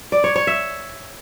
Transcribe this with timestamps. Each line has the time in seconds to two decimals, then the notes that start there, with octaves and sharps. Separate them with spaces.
0.12 D5
0.24 C#5
0.36 C#5
0.47 E5